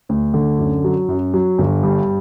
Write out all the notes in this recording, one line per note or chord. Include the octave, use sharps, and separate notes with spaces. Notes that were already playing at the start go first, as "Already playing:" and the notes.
D2
D3
F#2
F#3
F#2
F#3
G1
G2